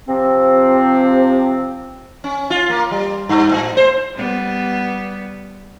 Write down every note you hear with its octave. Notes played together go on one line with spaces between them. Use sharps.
C3 F3 C4
C#4
F4
A#3
G3
G2
A2
C5
G3 B3